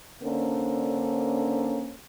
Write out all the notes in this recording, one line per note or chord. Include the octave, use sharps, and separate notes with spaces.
D3 A#3 C#4 D4 A4 C5